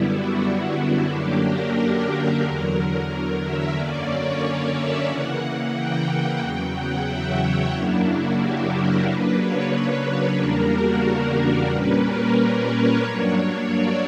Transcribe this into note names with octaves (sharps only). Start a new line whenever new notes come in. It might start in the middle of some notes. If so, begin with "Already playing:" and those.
Already playing: F#2 D3 G3 B3 D4 E4
F#4
F#4
F#2 D3 F#3 A#3 D4 G4
A#4
E2 D3 F#3
E5
F#2 D3 A#3 C#4 D5
C#5
D5
E5
C#3 E3 A#3 F#5
F#5
G5
E2 C#3 F#3 G5
F#5
E5
C#5
F#2 C#3 F#3 A#3 D4 E4
F#4
G4
A#4
C#3 F#3 A#3 D4 B4
C#5
B4
B4
E2 C#3 G3 A#3 D4 A#4
F#4
A#4
A#2 G3 A#3 C#4 B4
A#4
B4
C#5
G2 F#3 A#3 D4
D5